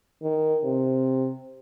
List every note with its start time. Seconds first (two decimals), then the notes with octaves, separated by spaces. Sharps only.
0.23 D#3
0.64 C3